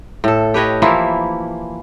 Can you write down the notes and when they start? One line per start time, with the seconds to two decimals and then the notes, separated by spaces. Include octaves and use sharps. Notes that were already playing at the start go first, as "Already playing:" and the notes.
0.24 A2 A4
0.54 G4 B4 C#5 D#5
0.82 E3 F3 A#3 E4